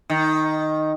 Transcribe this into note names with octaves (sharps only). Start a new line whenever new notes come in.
D#3